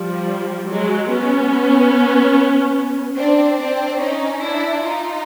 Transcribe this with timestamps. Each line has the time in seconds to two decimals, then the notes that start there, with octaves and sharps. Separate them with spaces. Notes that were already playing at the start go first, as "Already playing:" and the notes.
Already playing: F3 G3
0.69 F#3 G#3
1.10 B3 C#4
3.18 C4 D4
3.59 C4 D4
4.01 C#4 D#4
4.42 D4 E4
4.83 D#4 F4